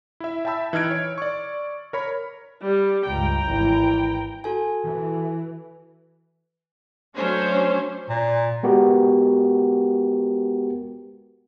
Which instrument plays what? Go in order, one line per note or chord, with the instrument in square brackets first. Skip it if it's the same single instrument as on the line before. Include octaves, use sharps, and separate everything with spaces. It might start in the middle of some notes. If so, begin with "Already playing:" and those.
[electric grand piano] E4 E5
E5 G5 A5 B5 E6
E3 D#4 F6 G#6 D7
C#5
D5 C#6
A#4 C#5 B5
[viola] G3
[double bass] C#2 G2 [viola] G5 A#5
[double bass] G#1 E3
[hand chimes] F#4 A4 G#5
[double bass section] E3
[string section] F#3 A3 C#4 D4 C5 C#5
[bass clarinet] A#2
[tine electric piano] G#3 B3 F#4 G4 A#4